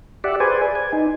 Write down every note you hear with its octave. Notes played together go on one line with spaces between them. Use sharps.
G4 D5 E5 F#5
G#4 B4 C5 D5 G#5
G#5
D#4